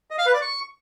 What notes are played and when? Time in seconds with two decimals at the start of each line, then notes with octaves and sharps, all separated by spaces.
0.11 D#5
0.18 F5
0.26 B4
0.34 D5
0.42 C#6